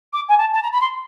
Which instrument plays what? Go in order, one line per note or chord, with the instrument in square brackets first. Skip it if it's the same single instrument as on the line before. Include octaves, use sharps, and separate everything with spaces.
[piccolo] D6
G#5
A5
A5
A#5
B5
C6